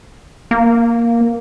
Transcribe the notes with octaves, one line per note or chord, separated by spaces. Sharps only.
A#3